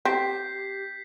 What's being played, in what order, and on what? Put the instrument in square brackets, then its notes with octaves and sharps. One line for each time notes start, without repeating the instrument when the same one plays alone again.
[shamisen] C4 [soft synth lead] G4 [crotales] G6 B6 C7